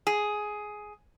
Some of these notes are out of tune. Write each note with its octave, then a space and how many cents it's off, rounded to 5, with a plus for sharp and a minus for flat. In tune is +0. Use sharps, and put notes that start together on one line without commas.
G#4 +10